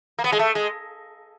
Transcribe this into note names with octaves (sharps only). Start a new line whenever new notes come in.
A#3
B3
G#3
A3
G#3